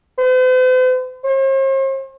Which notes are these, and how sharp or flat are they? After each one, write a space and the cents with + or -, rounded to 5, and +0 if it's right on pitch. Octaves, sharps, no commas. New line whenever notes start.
C5 -45
C5 +45